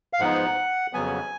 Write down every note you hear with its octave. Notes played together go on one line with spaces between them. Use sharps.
F5
G#2 F3 B3 D#4 F#5
F2 C#3 F#3 B3 G#5